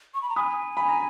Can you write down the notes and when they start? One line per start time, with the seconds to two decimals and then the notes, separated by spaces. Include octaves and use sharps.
0.14 C#6
0.22 B5
0.29 A#5
0.36 G#5 B5 D#6
0.77 B5
0.89 A#5